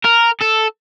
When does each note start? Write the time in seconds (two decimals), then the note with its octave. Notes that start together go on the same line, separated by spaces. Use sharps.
0.04 A#4
0.41 A4